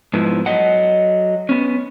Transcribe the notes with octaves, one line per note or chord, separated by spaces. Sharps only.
G#2 F3 B3 E4
F#3 D#5 F#5
B3 C#4